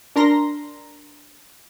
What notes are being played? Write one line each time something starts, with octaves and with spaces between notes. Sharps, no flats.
D4 A#4 A#5 C6 A#6